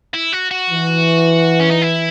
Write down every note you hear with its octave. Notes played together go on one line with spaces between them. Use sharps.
E4
F#4
F#4
E3
C#4
D#4
E4